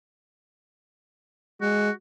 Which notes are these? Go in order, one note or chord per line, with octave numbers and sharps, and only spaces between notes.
G#3 F#4